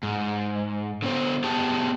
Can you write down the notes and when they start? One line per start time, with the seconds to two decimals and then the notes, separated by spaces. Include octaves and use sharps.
0.03 G#2
1.02 D3 B3 C5
1.44 B3 G4 G#4 A5